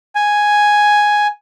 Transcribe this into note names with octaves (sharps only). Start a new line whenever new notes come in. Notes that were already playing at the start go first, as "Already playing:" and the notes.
G#5